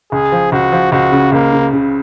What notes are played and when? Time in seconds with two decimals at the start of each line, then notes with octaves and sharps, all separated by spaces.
0.12 C#2 G#4
0.32 F3
0.52 C#2 F#4
0.72 F3
0.92 C#2 F#4
1.12 C#3
1.32 C#2 A#3
1.52 C#3
1.73 C#3